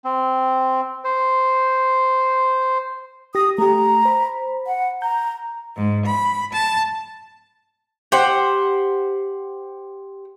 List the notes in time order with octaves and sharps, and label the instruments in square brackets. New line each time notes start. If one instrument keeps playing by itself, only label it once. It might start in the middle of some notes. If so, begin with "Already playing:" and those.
[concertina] C4
C5
[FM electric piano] G4 A#6 [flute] D#6
[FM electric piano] A3 G4 [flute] A#5
[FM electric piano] C5 B5
[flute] F#5
[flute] A#5 [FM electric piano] G6
[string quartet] G#2
B5
A5
[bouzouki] G4 C5 F#5